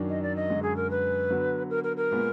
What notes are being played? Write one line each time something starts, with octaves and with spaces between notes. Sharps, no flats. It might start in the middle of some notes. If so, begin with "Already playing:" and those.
Already playing: F#2 D#3 F#3 D4
D#5
D5
D#5
F#2 D3 G#3
G#4
A#4
B4
D3 F#3 B3
A#4
A#4
A#4
A#2 G#3 B3